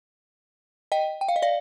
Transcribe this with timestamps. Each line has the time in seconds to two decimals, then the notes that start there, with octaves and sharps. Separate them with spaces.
0.92 D#5 G5
1.21 G5
1.28 F5
1.36 D#5
1.42 D5 F5